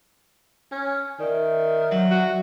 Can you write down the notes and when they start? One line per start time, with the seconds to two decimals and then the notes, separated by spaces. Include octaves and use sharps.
0.72 C#4
1.20 D#3 D5 E5
1.91 F#3
2.11 F#4